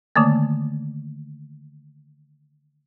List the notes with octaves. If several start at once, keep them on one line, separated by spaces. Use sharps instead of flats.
D3 D#3 A3 A#3